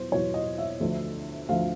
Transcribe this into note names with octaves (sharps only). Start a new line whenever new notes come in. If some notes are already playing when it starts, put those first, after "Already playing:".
Already playing: E2 B2 F#3 C5
E2 B2 F#3 C#5
D#5
E5
D2 D3 F3
D2 D3 F3 F5